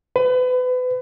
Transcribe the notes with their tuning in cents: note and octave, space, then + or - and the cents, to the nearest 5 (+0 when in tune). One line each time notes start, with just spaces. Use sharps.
B4 +30